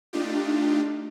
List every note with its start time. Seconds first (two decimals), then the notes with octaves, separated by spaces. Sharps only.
0.13 A3 D4 D#4 F4 G4